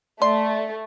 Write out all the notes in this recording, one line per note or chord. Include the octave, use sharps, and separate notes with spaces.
A3 D5 C6